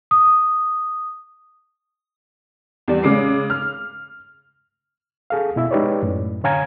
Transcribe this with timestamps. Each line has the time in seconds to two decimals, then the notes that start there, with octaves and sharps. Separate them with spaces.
0.11 D#6
2.88 E2 G3 D5
3.03 C#3 G#3 D6 C7
3.50 F6
5.30 G#4 A4 F5
5.56 B2 E4 E5
5.71 G#3 D#4 G4 B4 C#5 D5
6.03 F#2 A2
6.44 D3 C#5 F5 G#5 A#5 G#6